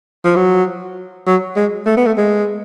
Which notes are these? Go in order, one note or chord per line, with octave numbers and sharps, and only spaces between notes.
F3
F#3
F#3
G#3
A3
B3
A3
G#3